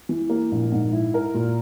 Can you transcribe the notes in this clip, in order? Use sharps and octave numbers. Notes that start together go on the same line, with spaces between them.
E3
A#3
A#1
G#2
E4
A#4
A#2